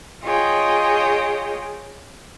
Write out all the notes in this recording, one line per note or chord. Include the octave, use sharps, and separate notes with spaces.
F4 G#4 C#5 D#5 G5